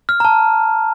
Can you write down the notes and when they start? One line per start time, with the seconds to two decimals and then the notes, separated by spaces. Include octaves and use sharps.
0.09 F6
0.20 A#5
0.25 A5